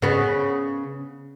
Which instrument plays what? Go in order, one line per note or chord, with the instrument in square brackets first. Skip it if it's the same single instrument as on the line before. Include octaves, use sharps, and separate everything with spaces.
[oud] C#3 B3